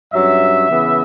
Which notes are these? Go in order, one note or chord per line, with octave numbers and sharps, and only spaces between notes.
G2 F#3 C#4 E5
C#3 E3 B3